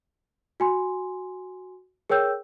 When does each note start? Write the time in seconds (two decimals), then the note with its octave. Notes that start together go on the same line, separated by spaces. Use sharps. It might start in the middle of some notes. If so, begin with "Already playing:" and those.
0.60 F#4 G#5 C6
2.10 G#4 A#4 C#5 G5 E6 G6